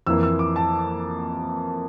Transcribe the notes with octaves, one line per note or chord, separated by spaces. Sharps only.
F2 E3 A#3 E6
E6
D6
A5